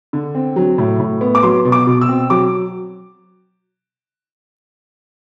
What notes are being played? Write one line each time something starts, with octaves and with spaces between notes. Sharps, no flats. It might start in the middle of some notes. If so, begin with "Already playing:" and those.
D3
C4
F#3
A2
A2
B3
D6
F#3 C6
B2
D6
B2
E6
C4
F#3 D6